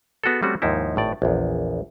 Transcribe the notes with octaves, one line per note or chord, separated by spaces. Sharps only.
B3 F#4 G#4 A4
G3 A3 C4 C#4 F#4
D#2 G#2 F3 D#4 E4
G#1 A2 D5
A#1 E2